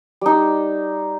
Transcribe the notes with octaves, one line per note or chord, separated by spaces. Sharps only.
G3 D#4